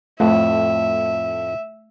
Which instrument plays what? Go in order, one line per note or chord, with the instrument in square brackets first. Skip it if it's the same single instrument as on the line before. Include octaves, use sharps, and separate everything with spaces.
[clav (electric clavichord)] F2 A2 [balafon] A3 [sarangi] E5